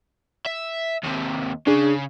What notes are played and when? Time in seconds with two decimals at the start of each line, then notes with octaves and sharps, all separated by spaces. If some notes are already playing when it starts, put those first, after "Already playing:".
0.46 E5
1.03 D#2 C3
1.67 C#3 D4 G#4